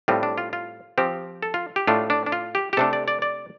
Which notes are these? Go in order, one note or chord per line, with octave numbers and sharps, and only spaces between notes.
A2 G3 C4 F4
D4
F4
F4
F3 C4 G4
A4
F4
G4
A2 A3 D4 F4
D4
D4
F4
G4
G4
C3 A3 D4 A4
D5
D5
D5